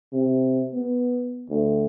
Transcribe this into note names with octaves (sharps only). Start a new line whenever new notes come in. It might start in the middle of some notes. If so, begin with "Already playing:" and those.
C3
B3
D2